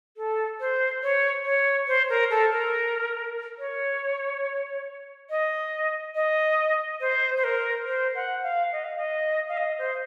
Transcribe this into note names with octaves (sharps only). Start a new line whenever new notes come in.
A4
C5
C#5
C#5
C5
A#4
A4
A#4
C#5
D#5
D#5
C5
C5
A#4
C5
F#5
F5
D#5
F5
D#5
F5
D#5
C5